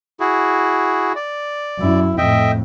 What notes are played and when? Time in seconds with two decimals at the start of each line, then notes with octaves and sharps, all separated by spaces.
0.20 E4 F#4 G#4
1.15 D5
1.79 F#2 E4
2.18 F2 A2 D#5 E5 G5